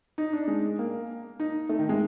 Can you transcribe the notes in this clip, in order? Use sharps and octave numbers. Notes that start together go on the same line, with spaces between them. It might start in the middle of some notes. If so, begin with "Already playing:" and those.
D#4
D4
G#3
A#3
D#4
A3
D#3
G#3